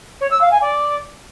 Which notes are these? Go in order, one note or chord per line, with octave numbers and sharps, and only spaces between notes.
C#5
E6
F5
G#5
D5